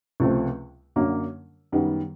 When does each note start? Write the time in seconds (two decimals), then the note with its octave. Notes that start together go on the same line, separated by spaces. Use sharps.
0.20 C#2 C3 F3 A3 C4
0.96 F#2 D3 F#3 A#3 C#4
1.72 F#2 D#3 G3 B3